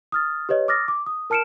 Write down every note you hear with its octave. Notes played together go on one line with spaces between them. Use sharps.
D#6 F6 A6
G4 B4 C#5 D#5
D6 D#6 F6 A6 A#6
D6
D#6
A#4 A5 F6 C#7 D7 E7